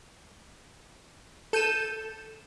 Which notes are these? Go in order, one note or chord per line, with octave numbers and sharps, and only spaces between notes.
A4 G6 D#7 E7